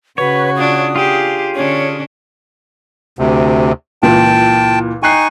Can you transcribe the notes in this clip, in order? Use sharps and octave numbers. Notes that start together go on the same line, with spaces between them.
C#3 F#4 B4 C#5
D4 F4 D#6
F4 G4 G#4
D3 C#4 D4 C#5
D2 C3
C#2 A#2 E3 G5 A5
D#4 G5 G#5 C#6 F#6 C7